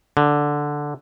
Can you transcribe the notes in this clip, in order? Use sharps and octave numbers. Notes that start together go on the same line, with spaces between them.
D3